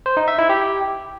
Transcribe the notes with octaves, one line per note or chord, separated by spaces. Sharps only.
C5
D#4
E5
E4
G4